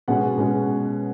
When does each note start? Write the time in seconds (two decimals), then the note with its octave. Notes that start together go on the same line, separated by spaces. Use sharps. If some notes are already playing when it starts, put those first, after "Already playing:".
0.08 B2 G#3 C#4 F#5
0.38 B2 G#3 C#4